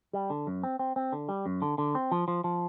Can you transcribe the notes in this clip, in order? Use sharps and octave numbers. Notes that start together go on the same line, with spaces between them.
G3
D3
F#2
C4
C4
C4
D3
G3
F#2
D3
D3
C4
F3
F3
F3